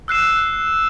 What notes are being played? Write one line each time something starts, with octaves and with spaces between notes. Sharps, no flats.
E6 F#6 C7 E7